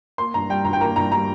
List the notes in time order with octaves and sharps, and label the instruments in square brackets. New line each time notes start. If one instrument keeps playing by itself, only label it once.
[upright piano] A#3 C6
G2 A#5
G3 G5
G2 A#5
G5
A#3 A#5
G2 A#5
G3 A#5